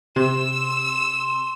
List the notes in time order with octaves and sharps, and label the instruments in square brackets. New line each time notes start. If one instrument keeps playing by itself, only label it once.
[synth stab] C3 [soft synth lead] C6 [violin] E6 E7